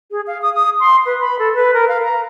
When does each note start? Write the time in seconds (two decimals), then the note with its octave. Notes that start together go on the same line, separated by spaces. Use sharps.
0.11 G#4
0.27 F5
0.42 D#6
0.54 D#6
0.80 C6
1.06 B4
1.21 B5
1.39 A4
1.55 B4
1.74 A#4
1.88 F5
2.02 A#5